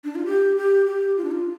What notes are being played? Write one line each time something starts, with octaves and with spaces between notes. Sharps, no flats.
D4
F4
G4
G4
G4
F4
D4
F4